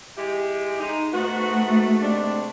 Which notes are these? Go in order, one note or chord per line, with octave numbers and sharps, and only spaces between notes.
G#3 E4 G4
G#3 D#4
G#2 A3 B3 F#4
C3 G#3 D4